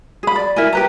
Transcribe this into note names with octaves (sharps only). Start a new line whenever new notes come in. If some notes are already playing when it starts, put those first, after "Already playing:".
G#4 B5
D5
E4 A#4 G#5
G4 B4 A#5